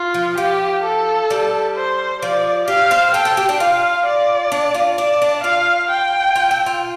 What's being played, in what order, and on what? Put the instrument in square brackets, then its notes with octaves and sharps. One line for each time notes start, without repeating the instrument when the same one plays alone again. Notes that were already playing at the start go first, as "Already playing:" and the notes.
Already playing: [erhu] F4
[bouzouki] F3
[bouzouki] F3 [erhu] G4
[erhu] A4
[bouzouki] G3
[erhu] C5
[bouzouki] F3 [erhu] D5
[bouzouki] G4 [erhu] F5
[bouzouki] C5
[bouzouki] A4 [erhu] G5
[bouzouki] A4
G4
D4
[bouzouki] F4 [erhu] F5
[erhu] D5
[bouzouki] D4
F4
[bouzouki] D4 [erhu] D5
[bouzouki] D4
[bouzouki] F4 [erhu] F5
[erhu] G5
[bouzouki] F4
A4
F4